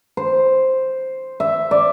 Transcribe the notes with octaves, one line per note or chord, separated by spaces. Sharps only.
C5
E5
D5